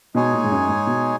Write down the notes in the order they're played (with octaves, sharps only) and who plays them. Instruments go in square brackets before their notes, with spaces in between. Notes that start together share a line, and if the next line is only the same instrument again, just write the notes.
[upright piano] B2 [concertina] G#3 D#4 G#4 C#5 G#5
[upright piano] A#2
G#2
F#2
G#2
B2